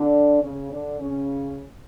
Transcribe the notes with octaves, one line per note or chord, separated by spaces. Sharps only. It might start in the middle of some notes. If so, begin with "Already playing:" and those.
Already playing: D3 D4
C#3 C#4
D3 D4
C#3 C#4